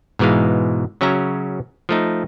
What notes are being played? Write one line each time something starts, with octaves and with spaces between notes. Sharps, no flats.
G#2 B2 E3 G#3 F5
C#3 F#3 C#4 E5 A#5
F3 A3 D#4